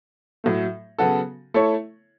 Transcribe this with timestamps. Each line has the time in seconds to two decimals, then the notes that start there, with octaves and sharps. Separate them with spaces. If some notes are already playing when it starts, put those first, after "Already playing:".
0.44 A2 F#3 A3
0.99 C#3 F#3 B3 F#4 A4
1.54 A3 E4 A4 C#5